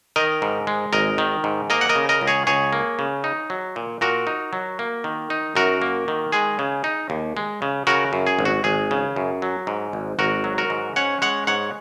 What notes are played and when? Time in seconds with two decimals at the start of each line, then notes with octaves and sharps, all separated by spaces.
0.16 D#3 A#4 D#5
0.42 G#2
0.67 G#3
0.93 G#1 A#4 D#5
1.18 D#3
1.44 G#2
1.70 A#3 A#4 D#5
1.81 F#5
1.89 A#4 D#5
1.95 C#3
2.09 A#4 D#5
2.21 C#2
2.28 G#4 C#5
2.47 C#2 G#4 C#5
2.73 A#3
2.99 C#3
3.24 D#4
3.50 F#3
3.76 A#2
4.01 A#2 F#4 A#4
4.27 D#4
4.53 F#3
4.79 A#3
5.04 D#3
5.30 D#4
5.55 F#2 F#4 A#4
5.82 A#3
6.08 D#3
6.32 G#3 G#4
6.59 C#3
6.84 D#4
7.10 D#2
7.37 G#3
7.62 C#3
7.87 C#3 F#4 A#4
8.13 F#2
8.27 G#4
8.39 G#1
8.45 F#4
8.64 G#1 G#4
8.91 C#3
9.16 F#2
9.42 F#3
9.67 G#2
9.93 G#1
10.19 G#1 F#4 A#4
10.44 F#3
10.58 F#4 A#4
10.70 G#2
10.96 C#4 C#5 F#5
11.22 G#3 C#5 F#5
11.47 G#2 C#5 F#5